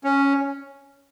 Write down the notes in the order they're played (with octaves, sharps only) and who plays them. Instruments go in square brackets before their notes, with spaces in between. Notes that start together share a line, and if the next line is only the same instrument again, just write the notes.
[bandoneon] C#4